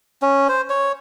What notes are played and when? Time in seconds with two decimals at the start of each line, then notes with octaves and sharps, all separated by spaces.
0.22 C#4
0.49 C5
0.70 C#5